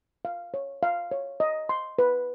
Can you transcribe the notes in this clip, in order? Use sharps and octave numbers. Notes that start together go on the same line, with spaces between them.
F5
C#5
F5
C#5
D#5
C6
B4